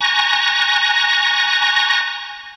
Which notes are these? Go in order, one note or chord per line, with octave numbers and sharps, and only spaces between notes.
G#5 A#5 C#6 F#6 A#6